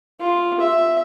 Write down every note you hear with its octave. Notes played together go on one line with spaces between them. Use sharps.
F4
E5